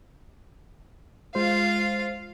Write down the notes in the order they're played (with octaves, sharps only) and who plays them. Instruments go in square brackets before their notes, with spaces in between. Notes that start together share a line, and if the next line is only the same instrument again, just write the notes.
[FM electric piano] G#3 C5 [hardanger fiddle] F4 F5